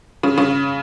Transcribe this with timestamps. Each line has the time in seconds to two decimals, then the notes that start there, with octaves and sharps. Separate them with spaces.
0.23 C#3
0.38 C#3